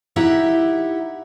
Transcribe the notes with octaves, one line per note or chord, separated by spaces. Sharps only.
D#4 E4 G4 E5 F#5